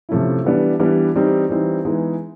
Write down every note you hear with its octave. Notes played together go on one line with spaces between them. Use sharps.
C3 F3 A3 C#4 E4
E3 G3 B3 D4
E3 G3 B3 D4
E3 G3 C4 D#4
E3 G3 C4 D#4
E3 G#3 B3 D#4